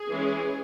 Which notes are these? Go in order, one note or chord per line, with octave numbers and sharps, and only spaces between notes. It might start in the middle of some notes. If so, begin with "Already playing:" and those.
Already playing: G#4
E3 G#3 C#4